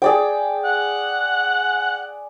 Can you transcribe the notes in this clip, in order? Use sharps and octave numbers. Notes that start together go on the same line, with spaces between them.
G#4 D5 G5
F#5